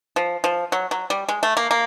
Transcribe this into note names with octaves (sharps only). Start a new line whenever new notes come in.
F3
F3
F#3
F#3
G3
G#3
A3
A#3
A#3